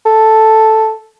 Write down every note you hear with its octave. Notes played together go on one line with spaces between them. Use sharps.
A4